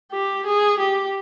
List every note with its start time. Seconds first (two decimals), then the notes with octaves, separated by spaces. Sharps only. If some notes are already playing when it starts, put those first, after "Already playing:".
0.12 G4
0.46 G#4
0.79 G4